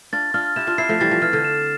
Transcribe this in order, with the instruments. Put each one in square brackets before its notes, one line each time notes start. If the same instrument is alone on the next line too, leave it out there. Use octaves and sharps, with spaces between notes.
[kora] D4 F4 [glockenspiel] A6
[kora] D4 F4 [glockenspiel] F6
[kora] E4 G4 [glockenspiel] E7
[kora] D4 F4
[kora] C4 E4 [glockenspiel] C7
[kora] F3 A3
[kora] E3 G3 [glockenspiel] A6
[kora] F3
[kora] E3 [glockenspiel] F6
[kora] D3
[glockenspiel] E7